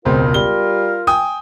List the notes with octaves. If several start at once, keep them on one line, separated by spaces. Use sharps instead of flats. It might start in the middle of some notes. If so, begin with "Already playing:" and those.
E1 C#2 C4 F4 A#4
G3 G7
G5 G#5 D#6